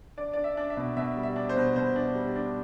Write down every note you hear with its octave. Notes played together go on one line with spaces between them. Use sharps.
D4 D5
D4 D5
E5
D4
E5
B2
B2 E5
G3
E5
D4
C5
B2
B2 C5
D4
G3
D4